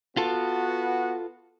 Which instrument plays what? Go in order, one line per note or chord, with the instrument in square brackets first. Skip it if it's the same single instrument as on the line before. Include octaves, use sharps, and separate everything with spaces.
[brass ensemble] B3 F#4 [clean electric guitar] F4 A4